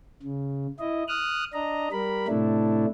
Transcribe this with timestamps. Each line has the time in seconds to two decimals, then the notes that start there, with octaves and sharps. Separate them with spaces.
0.23 C#3
0.79 E4 D#5
1.08 D#6 F6 F#6
1.53 D4 D#5 A#5
1.92 G3 A#4 B5
2.28 A2 C3 A3 D4 E4